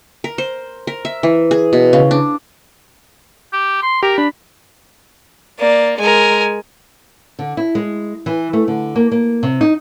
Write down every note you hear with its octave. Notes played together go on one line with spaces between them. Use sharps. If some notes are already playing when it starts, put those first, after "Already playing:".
A#4
C5
A#4
E5
E3
G#4
B2
C#3
D4
G4
C6
G4 A#4
D4 B5
A#3 D5
G#3 A#4 G#5
D3
E4
G#3
E3
A3
D3
A#3
A#3
C3
D#4